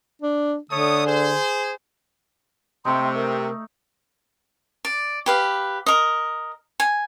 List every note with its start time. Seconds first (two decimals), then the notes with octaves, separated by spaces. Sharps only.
0.22 D4
0.71 D3 A3 C#5 D#6
1.05 G#4 C5
2.85 C3 A3 D#4 G5 C6
3.15 A#4
4.85 D5
5.26 G4 B4 F5
5.86 A#4 D#5
6.80 G#5